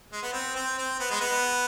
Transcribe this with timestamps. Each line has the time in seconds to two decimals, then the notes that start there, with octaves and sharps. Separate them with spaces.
0.13 G#3
0.23 B3
0.33 C4
0.56 C4
0.78 C4
1.00 B3
1.10 G#3
1.21 B3